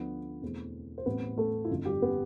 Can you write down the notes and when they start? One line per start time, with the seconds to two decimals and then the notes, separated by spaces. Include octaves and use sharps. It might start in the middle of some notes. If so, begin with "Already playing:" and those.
Already playing: D2 D3 F3 A3 B3 D4
0.42 E2 B2 A3 C4
0.98 C5
1.06 A1 A2 G3 B3 C4 B4
1.37 A3 A4
1.64 E4
1.70 G1 F2 D3 F4
1.85 G3 G4
2.02 B3 B4